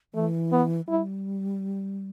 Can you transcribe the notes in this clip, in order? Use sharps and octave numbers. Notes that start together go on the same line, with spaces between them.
E3 A3
B3
G3 E4